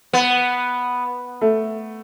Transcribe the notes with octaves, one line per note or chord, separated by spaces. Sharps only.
B3
A3